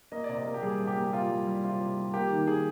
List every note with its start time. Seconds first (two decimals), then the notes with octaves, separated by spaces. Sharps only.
0.12 A#3 D#5
0.24 D5
0.29 C3
0.36 D#5
0.45 A#3
0.54 G4
0.63 G3 G#4
0.79 C3
0.87 G4
0.96 A#3
1.03 G4
1.13 C3 F4
1.30 G3
1.47 G3
1.64 C3 F4
1.80 C3
1.97 G3
2.14 A#3 G4
2.30 D#3
2.47 D#3 G#4